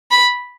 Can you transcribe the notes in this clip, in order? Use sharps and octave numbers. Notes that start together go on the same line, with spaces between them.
B5